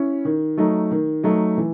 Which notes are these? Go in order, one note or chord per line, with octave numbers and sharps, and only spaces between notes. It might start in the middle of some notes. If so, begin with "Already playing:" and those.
Already playing: C#4 E4
D#3
F#3 A3 D#4
D#3
F#3 A3 D#4
E3